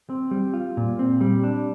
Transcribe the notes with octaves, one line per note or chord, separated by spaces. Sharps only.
C4
G3
F4
A#2
C4
G3
D4